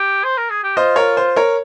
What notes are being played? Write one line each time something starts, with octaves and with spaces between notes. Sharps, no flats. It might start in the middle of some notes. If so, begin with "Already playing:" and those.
Already playing: G4
C5
A#4
G#4
G4
F4 C5 D#5
A#4 C#5
C5
A#4 C#5